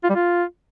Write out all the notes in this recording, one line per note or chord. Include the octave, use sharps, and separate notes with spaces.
F4
G3
F4